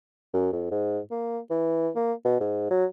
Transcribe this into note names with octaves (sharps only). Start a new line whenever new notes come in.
F#2
F2
G#2
A#3
E3
A#3
B2
G#2
F#3